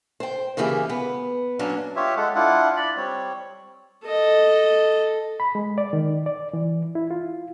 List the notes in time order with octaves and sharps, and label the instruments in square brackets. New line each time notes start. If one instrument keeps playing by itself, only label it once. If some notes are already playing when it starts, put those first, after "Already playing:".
[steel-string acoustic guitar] C5 G5
C#3 E3 A#3 G4 G#4 E5
B3
F#3 A#3 C#4 D4
[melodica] F4 G4 C#5 E5
G#3 A4 F#5
D4 E4 F4 F#5
D5 B5
G3 C4 C#5
[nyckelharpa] A4 D#5
[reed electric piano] B5
G#3
D5
D#3
D5
E3
E4
F4